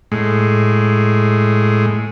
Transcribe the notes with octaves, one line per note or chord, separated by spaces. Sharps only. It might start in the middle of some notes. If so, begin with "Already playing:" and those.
A2 G#3